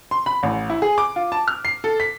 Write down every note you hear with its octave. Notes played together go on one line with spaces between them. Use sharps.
C6
B5
A1
E4
G#4
D6
F4
A5
F6
C7
A4
B6